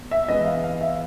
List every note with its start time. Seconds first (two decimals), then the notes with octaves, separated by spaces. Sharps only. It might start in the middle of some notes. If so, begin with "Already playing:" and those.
Already playing: B2
0.11 E5
0.28 E3 G#3 B3 D#5
0.46 F5
0.64 F5
0.81 E5